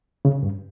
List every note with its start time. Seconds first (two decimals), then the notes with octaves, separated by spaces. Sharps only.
0.25 C#3
0.43 G2